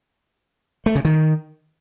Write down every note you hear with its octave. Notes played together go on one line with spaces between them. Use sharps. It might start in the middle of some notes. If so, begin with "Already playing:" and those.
A3
C#3
D#3